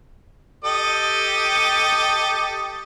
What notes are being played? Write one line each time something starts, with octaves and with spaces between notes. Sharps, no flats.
G4 A4 D#5